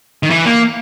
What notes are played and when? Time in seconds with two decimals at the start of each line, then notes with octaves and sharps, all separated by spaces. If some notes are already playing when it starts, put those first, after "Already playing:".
0.23 D#3
0.30 E3
0.46 A#3